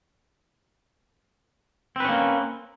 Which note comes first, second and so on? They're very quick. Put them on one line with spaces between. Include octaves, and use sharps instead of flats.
C4 B4 C#4 A#3